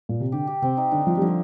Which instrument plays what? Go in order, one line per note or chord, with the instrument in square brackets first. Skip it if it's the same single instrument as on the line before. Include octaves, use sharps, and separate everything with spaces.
[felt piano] A#2
C3
[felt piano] D3 [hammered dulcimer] G4
[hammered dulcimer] G4
[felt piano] C3 [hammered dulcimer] C4
[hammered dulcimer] D#4
[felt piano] D3 [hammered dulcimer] D4
[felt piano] F3 [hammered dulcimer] F4
[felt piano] G3
[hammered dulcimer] D3 [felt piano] F3